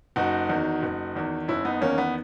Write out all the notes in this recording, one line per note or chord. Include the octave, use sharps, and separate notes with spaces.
F#1 D#4 F#4
E2 D#3
F#1
E2 D#3
F#1 C#4 E4
B3 D#4
E2 D#3 A#3 C#4
B3